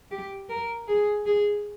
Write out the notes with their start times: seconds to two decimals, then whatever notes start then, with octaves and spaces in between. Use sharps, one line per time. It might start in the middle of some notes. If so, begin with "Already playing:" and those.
0.11 G4
0.49 A#4
0.88 G#4
1.26 G#4